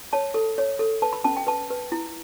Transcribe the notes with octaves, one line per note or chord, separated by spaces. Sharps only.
C#5 A5
A4
C#5
A4
B4 A5
B5
C#4 A5
G5
B4 A5
B4
E4